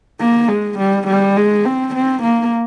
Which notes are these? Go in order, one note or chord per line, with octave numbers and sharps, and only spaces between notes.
A#3
G#3
G3
G3
G#3
C4
C4
A#3